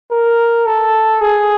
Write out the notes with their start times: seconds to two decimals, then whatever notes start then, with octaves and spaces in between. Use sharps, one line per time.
0.11 A#4
0.66 A4
1.21 G#4